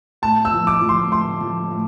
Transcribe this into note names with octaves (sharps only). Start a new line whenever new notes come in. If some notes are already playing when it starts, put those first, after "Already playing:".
A2 A5
E6
F3
D6
F3
C6
A2 C6
F3
A2